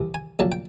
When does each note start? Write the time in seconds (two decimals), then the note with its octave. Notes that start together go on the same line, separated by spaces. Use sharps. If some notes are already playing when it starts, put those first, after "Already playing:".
Already playing: C2 C3 E3
0.14 G#5
0.39 A#1 A#2 F#3 A5
0.52 G5